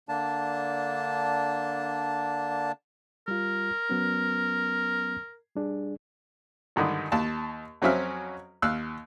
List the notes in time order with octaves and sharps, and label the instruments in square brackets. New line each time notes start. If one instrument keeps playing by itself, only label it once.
[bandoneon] D3 A#3 D4 A5
[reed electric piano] G3 F4 [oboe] A#4
[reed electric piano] F#3 B3 C#4
G3 D4 G#4
[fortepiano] G#1 G2 D3 D#3
D#2 A5
F2 F#3 C4 C#4 E5 F6
D#2 F5 E6 F#6